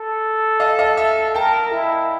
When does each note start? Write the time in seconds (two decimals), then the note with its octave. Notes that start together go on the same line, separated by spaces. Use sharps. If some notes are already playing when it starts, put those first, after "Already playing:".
Already playing: A4
0.60 D#5 F5
0.79 D#5 F5
0.97 E5
1.35 A#4 G5 A5
1.72 E4